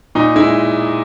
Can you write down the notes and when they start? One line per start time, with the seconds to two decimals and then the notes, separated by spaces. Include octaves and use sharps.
0.15 A#2 D#4
0.36 G#3 E4